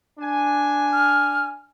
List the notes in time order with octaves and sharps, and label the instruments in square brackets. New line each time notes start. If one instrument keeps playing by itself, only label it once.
[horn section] D4 G#5
[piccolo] F6